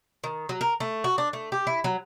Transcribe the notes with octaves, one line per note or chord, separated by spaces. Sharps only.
D#3
F#3
A#4
A3
F#4
D4
A3
G4
E4
F#3